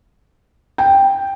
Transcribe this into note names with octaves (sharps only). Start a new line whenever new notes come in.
G5